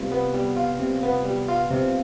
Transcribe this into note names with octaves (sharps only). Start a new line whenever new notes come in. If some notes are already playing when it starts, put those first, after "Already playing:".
Already playing: C3 G3 B3 F4
B3
G3
F4
C3
B3
G3
F4
C3